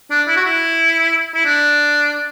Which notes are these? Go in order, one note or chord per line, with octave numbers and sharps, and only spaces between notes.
D4
E4
F#4
E4
E4
D4